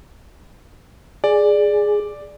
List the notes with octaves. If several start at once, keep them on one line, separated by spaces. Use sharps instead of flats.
G#4 D5